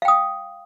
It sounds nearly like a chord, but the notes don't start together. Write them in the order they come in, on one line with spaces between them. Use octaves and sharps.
F5 G5 D#6